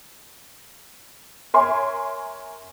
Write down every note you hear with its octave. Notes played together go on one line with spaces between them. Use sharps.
A#4 C#5 E5 G#5 C6